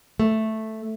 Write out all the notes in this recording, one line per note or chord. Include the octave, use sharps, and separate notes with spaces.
A3